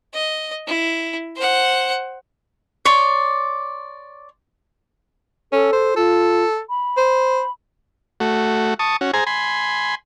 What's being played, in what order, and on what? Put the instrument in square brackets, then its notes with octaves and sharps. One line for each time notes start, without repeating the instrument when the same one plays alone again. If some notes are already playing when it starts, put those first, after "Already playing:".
[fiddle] D#5
E4
C5 F#5
[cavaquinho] C#5 D5 C6
[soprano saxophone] C#4 [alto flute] A4
[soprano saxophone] C5
[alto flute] F4 [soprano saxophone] A4
[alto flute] B5
[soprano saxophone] C5
[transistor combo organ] A3 F#4
A5 C#6 D#6
C#4 F#4
G#4 C5 G#5 A#5
G#5 B5 C6